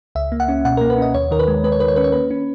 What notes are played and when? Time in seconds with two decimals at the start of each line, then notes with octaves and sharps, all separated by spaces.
0.15 C#2 E5
0.32 A#3
0.40 F#5
0.48 C#4
0.65 B2 F#5
0.77 A#3 A#4
0.90 B4
0.98 C#4 D#5
1.14 D#2 C#5
1.31 D#3 A#4
1.39 B4
1.48 G#3
1.64 G#3 B4
1.72 C#5
1.80 D#3 B4
1.88 C#5
1.96 C#4 B4
2.04 C#5
2.12 A#3 B4
2.31 C#4